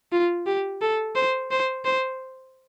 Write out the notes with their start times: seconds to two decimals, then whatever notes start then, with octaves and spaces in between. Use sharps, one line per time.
0.12 F4
0.47 G4
0.81 A4
1.15 C5
1.51 C5
1.85 C5